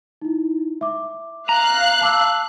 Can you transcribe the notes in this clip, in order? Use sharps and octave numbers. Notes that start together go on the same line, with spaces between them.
D#4 E4
E5 D6
F5 A#5 F#6
A5 D6 E6